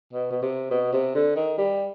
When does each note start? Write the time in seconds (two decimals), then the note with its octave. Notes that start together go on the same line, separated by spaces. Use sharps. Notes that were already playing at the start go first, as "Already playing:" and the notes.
0.13 B2
0.31 B2
0.42 C3
0.71 B2
0.93 C3
1.15 D3
1.36 D#3
1.58 G3